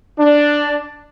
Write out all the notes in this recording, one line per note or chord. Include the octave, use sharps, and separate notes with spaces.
D4